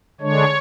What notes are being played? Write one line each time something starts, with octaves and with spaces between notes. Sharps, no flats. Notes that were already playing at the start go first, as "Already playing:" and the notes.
D3 G#3 D4 C#5